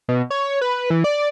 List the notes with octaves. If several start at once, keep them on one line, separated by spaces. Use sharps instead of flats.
B2
C#5
B4
E3
D5